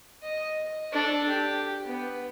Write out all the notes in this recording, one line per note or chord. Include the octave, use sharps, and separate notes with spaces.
D#5
D4 A4
G4
B3